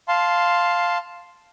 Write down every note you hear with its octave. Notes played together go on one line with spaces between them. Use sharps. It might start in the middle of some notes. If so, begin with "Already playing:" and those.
F5 A5 C6